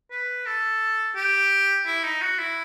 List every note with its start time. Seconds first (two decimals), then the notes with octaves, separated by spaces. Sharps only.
0.11 B4
0.46 A4
1.16 G4
1.86 E4
2.04 D#4
2.22 F#4
2.39 E4